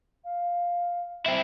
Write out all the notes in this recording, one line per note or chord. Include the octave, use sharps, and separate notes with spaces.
F5
C4 E4